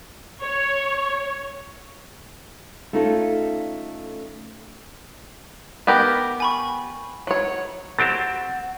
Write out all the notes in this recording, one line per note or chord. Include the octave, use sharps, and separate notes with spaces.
C#5
A3 C#4 D#4 F4 A4
B3 G4 A#4
G#5 B5 C#6
F#3 C#5
F#3 C4 G4 F#5 A6 D7 E7